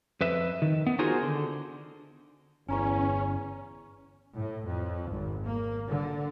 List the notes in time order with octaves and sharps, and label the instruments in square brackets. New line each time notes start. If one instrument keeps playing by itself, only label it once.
[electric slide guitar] F2 B4 E5
D#3
B3
D#4 F4 F#4 G#4 A#4 C5
D3
[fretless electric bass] G1 [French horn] E2 [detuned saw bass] C#4 [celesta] G#5 A#5 C#6
[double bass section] A2
F2
G#1
A#3
D3